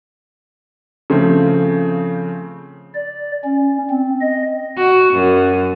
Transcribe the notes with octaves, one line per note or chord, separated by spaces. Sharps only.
C#3 F3 A3 C4
D5
C#4
C4
D#5
F#4
F#2